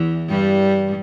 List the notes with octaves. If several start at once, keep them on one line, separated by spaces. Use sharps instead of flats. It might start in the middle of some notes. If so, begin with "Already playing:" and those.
Already playing: E2 E3
G2 G3